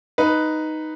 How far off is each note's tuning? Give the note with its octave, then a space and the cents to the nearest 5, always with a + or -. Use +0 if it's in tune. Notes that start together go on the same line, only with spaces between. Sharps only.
D#4 +0 B4 +0